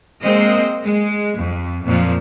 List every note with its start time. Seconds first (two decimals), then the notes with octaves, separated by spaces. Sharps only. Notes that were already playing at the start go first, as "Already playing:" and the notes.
0.22 G#3 A#3 C4 C5 D#5
0.83 G#3
1.37 F2
1.84 F2 A#2 F3